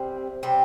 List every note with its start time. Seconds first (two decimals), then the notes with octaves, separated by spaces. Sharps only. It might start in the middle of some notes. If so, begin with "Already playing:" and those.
Already playing: C3 G3 C4
0.43 C3 G3 C4